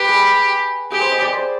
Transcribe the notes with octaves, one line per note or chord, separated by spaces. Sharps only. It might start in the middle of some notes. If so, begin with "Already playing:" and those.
Already playing: G4 B4
G#4
G4 G#4
C5
D#5
D5
C5